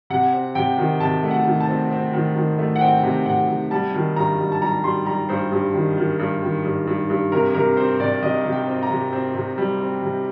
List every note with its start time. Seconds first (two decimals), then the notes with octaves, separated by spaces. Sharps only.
0.10 C3 F#5
0.33 C4
0.55 C3 G5
0.78 D#3
1.00 C3 A5
1.23 A3
1.31 F#5
1.45 D#3
1.60 A5
1.68 C4
1.91 C4
2.13 D#3
2.36 D#3
2.59 A3
2.76 F#5
2.81 C4 G5
3.03 C3
3.26 C3 F#5
3.49 C3
3.71 G3 A5
3.94 D#3
4.16 G2 A#5
4.39 G3
4.52 A5
4.61 G3 A#5
4.84 G3 C6
5.06 G3 A#5
5.29 G2 C5
5.52 G2
5.74 D#3
5.97 D#3
6.19 G2
6.42 D#3
6.65 G2
6.87 G2
7.10 G2
7.32 C3 A#4
7.54 C3 A#4
7.77 C4 C5
8.00 C3 D5
8.22 C3 D#5
8.45 C3
8.52 G5
8.67 C4
8.83 A#5
8.90 C3
9.13 C4
9.35 C3
9.58 G3
9.80 C4
10.03 C3